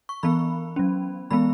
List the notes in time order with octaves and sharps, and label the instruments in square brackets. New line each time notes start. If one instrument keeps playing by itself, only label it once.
[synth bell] C#6
E3 B3 B5
F#3 C#4
E3 G#3 B3 B5